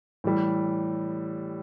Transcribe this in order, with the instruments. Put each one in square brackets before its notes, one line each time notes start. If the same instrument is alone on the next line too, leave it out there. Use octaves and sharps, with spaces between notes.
[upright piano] A2 E3 G3